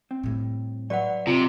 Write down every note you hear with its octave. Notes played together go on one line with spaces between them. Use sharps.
C4
A2 G3
F#3 B4 D5 E5 F#5
C3 F4